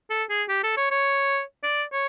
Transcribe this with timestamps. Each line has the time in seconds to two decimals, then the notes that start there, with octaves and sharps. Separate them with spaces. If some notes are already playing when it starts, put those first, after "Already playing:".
0.10 A4
0.30 G#4
0.49 G4
0.63 A4
0.77 C#5
0.91 C#5
1.63 D5
1.93 C#5